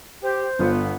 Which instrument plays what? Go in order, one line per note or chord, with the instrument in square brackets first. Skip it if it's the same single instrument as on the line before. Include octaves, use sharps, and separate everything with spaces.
[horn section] G4 [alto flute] C5
[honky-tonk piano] G1 F4 [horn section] B3